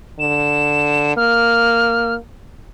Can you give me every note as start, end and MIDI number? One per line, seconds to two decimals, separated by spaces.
0.20 1.15 50
0.20 1.12 100
1.17 2.17 58
1.17 2.14 89